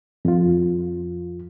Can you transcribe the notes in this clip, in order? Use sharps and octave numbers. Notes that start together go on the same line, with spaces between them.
F2 F4